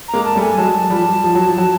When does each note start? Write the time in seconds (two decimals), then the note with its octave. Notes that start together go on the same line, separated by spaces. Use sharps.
0.08 A#5
0.13 G#3 A#3
0.25 A5
0.35 G3 A3
0.41 G#5
0.57 F#3 G#3 A5
0.90 F3 G3
1.24 F3
1.35 F#3
1.47 F3
1.58 F#3